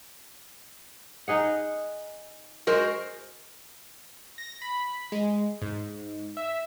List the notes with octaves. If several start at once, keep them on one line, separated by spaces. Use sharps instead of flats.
D#4 G#4 F#5
G#3 F#4 A#4 C5
A#6
B5
G#3
G#2
E5